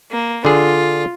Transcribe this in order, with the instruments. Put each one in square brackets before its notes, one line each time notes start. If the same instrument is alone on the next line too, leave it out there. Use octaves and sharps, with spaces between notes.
[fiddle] A#3
[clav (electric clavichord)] D3 G#4 [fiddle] F4